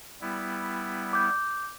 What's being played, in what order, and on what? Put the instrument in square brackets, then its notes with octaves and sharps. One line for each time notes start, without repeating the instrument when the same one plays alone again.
[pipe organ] G3 B3 E4
[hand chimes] D6 G6